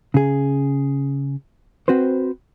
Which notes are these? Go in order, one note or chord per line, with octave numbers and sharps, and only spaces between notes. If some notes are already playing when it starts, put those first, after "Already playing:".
C#3 G#4
C4 F#4 B4 C5